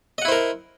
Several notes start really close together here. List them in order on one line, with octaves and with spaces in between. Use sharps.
D#5 F#5 E4 C5 A#4